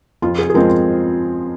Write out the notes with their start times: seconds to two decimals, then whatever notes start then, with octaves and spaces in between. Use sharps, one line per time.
0.22 F2 F4
0.38 G#4
0.50 G#4
0.54 F3 G#3 C4 A#4